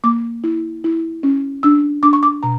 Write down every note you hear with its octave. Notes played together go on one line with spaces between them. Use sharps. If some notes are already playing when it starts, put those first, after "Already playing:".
A#3 D6
E4
E4
C#4
D4 E6
D4 D6
C#6
D6
B2 A#5